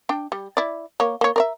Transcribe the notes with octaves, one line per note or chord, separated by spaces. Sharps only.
D4 G5
G3
E4 D5
A#3 C#5
A#3 C#5
A#4 D5 E5